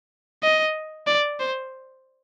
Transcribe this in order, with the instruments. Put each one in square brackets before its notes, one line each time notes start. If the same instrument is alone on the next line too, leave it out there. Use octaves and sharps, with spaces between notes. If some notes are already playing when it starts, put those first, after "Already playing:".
[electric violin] D#5
D5
C5